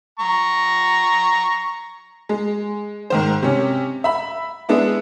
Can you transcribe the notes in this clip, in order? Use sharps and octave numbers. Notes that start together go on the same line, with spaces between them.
A#5 C#6
G#3
G#2 D#3 C5
C3 C#4
E5 B5
G#3 B3 D4 E4